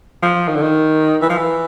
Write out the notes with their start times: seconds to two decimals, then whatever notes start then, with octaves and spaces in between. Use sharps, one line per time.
0.23 F3
0.48 D#3
0.55 D3
0.62 D#3
1.22 E3
1.29 F3
1.38 E3